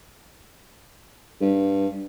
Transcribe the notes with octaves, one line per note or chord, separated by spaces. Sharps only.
G2